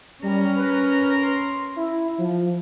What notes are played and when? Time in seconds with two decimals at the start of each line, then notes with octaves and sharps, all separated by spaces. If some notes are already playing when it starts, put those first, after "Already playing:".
0.23 G3 C#4 A#4
0.56 B4
1.22 C6
1.76 E4
2.18 F3